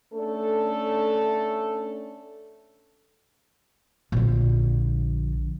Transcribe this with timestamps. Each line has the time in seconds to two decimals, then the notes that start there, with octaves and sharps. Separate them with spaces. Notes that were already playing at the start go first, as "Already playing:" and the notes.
0.13 A3 C#4 D4 A4
4.12 A#1 D3